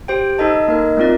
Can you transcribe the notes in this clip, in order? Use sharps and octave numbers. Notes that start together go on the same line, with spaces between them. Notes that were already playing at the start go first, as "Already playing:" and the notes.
G4 C5 G5
D#4 A4 D#5 A5
A#3 D#4 A#4 D#5
A3 C4 F4 A#4 D5